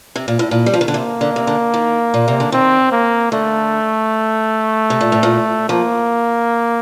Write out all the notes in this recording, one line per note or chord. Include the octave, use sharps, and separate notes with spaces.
C3
A#2
A2
A#2
G3
F3
D#3
D3
C3 A#3
D3
C3
D3
D#3
A#2
C3
D3
D#3 C4
A#3
D3 A3
C3
A#2
A2
A#2
F3 A#3